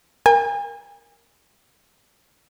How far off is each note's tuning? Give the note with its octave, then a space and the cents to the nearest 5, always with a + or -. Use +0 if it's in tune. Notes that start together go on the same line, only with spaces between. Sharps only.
A#4 +0 G#5 -40